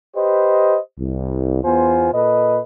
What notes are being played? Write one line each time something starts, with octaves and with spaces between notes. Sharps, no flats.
G4 B4 C5 D#5
C2
E2 B3 F4 C5 G#5
A#2 A4 B4 D#5